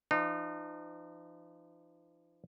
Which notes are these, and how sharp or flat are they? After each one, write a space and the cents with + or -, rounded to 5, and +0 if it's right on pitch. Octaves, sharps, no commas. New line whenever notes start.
F3 -40 D#4 -35